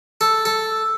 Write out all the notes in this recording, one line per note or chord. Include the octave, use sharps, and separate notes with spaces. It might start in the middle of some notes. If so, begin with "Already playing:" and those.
A4
A4